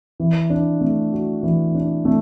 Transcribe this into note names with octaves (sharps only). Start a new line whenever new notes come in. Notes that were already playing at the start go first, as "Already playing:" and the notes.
E3
D4
A3
F#4
E3
D4
A3